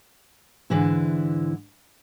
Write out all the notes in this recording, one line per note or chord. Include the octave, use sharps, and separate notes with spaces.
G#2 D3 E3 E4